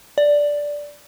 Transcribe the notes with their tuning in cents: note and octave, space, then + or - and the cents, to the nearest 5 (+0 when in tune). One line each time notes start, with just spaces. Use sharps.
D5 -5